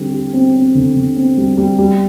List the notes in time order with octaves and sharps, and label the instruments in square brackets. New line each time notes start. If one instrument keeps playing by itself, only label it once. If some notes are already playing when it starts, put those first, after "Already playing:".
Already playing: [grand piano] D3 G3 C4 G4
G4
C4
C4
D3
D3
C4
G3
G3
G3